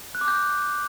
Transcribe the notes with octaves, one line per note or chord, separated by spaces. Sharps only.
F#6
D6
G6